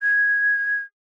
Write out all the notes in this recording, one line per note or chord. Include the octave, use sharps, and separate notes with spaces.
G#6